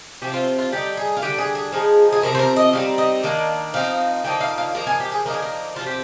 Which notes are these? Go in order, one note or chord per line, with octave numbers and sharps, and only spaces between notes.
C3 F3 C4 G4
F4
F4
D3 G3 C4 D#4 G4
G#4
F4
D3 G3 D4 G4
G#4
G#4
F3 G#3 D#4
G#4
C3 F3 C4 A#4
C5
A#4
D#5
D3 G3 C4 D#4 F5
D#5
D#3 A#3 D4
F3 C4 D#4 F5
D3 F3 A#3 D#4 G5
F5
F5
F3 A#3 D#4 A#4
G#4
G4
G#4
D3 F3 A#3 D#4 A#4
G#4
A#4
C3 F3 C4 F4
G4